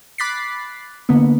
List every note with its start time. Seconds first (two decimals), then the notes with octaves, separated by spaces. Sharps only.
0.18 B5 D6 F#6 A6 B6 C7
1.09 D3 A#3 B3